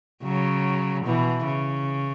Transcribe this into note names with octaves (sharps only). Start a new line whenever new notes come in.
C#3 F#3
B2 E3
C#3